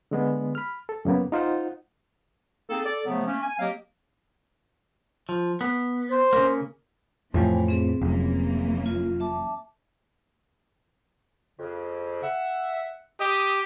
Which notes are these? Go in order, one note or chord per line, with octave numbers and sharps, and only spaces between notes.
D3 G#3 B3
B5 F6
A4
F#2 C#3 A#3 B3
D#4 F4 C5 F#5
A#3 C4 D#4 G#4 A4
A4 D5
C#3 F3 F#3 A3 B3
A3 A#3 C#4
G#5
F#3 A#3 C4 G4 D#5 F5
F3
B3
C5
C#3 A#3
F2 A2 E3 F3 G5 G#5
C4 G#4
F1 F#2 E3 A#3
F4
E5 A5 D6
F2 C#3
E5 F#5
G4 D#6